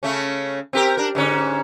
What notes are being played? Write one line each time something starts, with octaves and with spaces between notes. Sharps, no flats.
C#3 A3 C#4
C4 G4 A#4
D4 A#4
G#2 D3 C#4